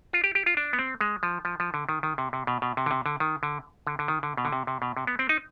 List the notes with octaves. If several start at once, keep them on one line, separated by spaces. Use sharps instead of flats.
F4
G4
G4
F4
D4
B3
C4
G#3
F3
F3
F3
D3
D#3
D#3
C3
C3
B2
B2
C3
D3
C3
D3
D#3
D3
D3
D3
D#3
D3
B2
D3
C3
C3
B2
C3
B3
C4
D#4